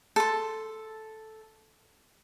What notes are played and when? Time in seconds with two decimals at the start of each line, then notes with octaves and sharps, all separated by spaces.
0.16 A4 C6